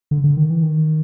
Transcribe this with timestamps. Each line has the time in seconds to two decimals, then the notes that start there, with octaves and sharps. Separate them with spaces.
0.11 D3
0.24 D3
0.37 D#3
0.50 E3
0.62 D#3